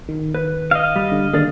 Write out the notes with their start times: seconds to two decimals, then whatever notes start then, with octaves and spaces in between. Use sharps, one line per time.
0.09 D#3
0.34 B4
0.71 D#5 F5
0.96 G3
1.12 D3
1.33 D#2 D3 G#4 A#4 D5